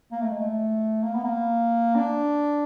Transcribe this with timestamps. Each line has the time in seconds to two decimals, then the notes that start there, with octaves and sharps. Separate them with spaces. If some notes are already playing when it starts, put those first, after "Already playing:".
0.12 A#3
0.22 A3
0.31 G#3
0.40 A3
1.03 A#3
1.15 B3
1.24 A#3
1.95 D4